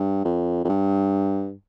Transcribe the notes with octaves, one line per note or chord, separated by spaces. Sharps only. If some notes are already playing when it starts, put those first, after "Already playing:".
Already playing: G2
F2
F2
G2